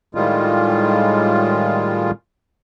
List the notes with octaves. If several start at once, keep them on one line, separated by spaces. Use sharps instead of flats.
A2 D#3 G3 G#3 F4